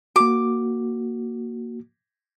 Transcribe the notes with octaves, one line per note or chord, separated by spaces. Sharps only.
A#3 F#4 D6